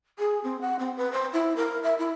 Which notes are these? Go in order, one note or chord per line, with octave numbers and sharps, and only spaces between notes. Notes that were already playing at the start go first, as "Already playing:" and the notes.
G#4
C4
F#5
C4
B4
C5
E4
A#4
E5
E4